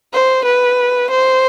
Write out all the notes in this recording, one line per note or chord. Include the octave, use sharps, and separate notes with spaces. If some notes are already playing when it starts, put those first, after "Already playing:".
C5
B4
C5